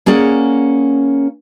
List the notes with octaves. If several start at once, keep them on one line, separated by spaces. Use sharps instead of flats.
A#3 C#4 G#4 D5 F#5